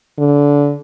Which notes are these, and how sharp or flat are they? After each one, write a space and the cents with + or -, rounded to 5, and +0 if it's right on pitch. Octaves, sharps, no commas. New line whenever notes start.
D3 -25